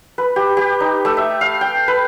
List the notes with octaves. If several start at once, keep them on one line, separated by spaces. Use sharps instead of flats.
B4
G4
G4
D#4
A3
E5
F5
G5
B4